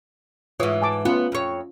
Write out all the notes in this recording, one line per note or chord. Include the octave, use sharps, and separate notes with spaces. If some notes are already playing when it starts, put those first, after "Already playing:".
G#2 E3 F4 C#5 D#6
G#5 A5 D6
B3 C#4 F4
F2 C#5